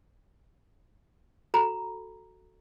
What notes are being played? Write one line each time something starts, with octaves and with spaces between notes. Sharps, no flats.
F#4 A4 A#5 B5